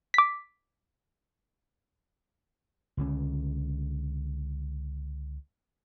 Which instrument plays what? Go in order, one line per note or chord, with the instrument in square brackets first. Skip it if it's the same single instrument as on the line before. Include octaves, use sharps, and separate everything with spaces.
[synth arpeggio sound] D6 B6
[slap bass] C#2 D3 C#4